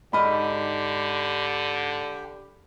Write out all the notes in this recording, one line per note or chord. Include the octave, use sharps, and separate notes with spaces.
G#2 D3 G4 D#5 B5 F6